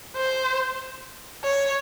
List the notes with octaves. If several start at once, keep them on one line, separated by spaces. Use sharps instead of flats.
C5
C#5